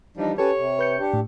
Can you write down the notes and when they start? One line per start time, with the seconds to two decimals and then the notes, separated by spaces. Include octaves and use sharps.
0.17 E3 F3 G3 D4 D#4
0.38 C#4 G4 A4 B4 C#5 A5
0.56 C3
0.79 B4 G6 C#7
0.98 D4 G4
1.13 A2